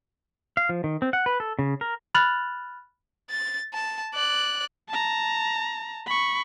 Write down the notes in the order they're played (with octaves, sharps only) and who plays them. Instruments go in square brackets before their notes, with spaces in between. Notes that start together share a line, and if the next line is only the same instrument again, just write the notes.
[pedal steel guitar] F5
F3
D#3
C4
F#5
B4
A4
C#3
A#4
[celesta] B5 F6 F#6 A6 F7 F#7
[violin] A6
A5
D5 F#6
[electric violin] A5 A#5
B5 C#6